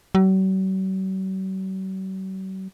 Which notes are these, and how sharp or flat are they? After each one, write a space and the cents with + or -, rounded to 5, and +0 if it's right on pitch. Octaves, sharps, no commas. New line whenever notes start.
F#3 +45